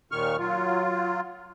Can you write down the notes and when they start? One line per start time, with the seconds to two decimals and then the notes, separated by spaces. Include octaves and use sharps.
0.11 D#2 A#2 D#3 C#6 F6
0.39 F#3 F4